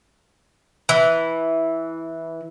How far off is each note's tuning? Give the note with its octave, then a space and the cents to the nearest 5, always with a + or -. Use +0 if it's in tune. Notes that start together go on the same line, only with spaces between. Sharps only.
E3 -10